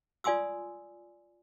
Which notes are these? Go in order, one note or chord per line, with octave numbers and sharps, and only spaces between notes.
F4 D5 G#5 C6 D#6 E6